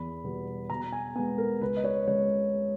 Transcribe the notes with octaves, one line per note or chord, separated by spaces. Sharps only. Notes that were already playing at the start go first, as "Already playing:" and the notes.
Already playing: E2 B5
B2 G3 B3
B2 A#5
G#5
G#3 B3 G#5
A#4
C#2 B4
D#5
C#5
C#3 G#3 C#5